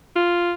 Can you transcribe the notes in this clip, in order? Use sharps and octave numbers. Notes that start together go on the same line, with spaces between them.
F4